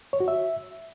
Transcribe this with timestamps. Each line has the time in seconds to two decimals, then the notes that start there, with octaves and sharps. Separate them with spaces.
0.13 C#5
0.20 F#4
0.28 E5